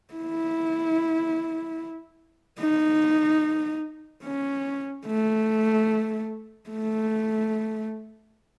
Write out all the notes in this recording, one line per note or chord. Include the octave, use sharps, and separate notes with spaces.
E4
D#4
C#4
A3
A3